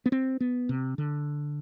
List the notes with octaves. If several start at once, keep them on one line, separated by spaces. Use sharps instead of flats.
B3
C4
B3
C3
D3